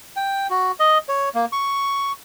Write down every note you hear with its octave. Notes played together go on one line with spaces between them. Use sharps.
G5
F#4
D#5
C#5
A#3
C#6